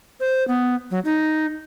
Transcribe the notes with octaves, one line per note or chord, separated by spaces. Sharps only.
C5
B3
F#3
D#4